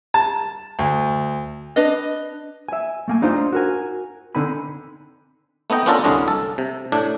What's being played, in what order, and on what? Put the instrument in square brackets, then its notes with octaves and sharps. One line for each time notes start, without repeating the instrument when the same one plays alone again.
[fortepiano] A5
D2
[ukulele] D4 B4 D#5
[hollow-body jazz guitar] E5 G#5
A3 A#3 G#5
D4 D#4 F4 C5
F#4 A#4 G#5
D3 C4 D#4 G#5 B5
[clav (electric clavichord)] A3 B3 D#4 D#5 G5
B3 C#4 D4 F4 A4 A#4
C2 F#2 D3 C#4 D4 D#5
A4
C3
A2 D4